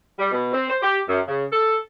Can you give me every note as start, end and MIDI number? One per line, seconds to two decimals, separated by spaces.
0.19 0.29 55
0.32 0.52 47
0.54 0.69 60
0.70 0.79 72
0.83 0.99 67
1.09 1.21 42
1.28 1.45 49
1.53 1.77 69